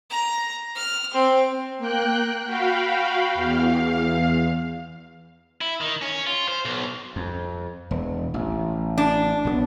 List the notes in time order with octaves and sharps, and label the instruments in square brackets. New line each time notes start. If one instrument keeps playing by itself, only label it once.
[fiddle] A#5
F6
C4
[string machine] A#3 G5 F#6
F#4 F5 G5 B5
E2 F5
[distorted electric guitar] E4
D#3
C#4
F4
C5
B1
[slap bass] F2
E1
A1
[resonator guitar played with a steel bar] D4
[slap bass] B1 G3 B3